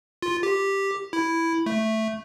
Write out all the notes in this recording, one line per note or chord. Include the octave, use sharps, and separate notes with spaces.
F4
G4
E4
A3